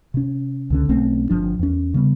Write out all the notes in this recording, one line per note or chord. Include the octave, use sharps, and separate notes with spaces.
C3 C#4
C#2 D3 C#4
B1 A3 C4 C#4
G1 F3 D4
E2 C#4
C#3 G3 B3